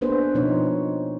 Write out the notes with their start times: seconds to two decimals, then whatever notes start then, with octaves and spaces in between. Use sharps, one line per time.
0.01 A#3 B3 D4 G#4 B4 C5
0.35 B2 F3 C4 D#4 C#5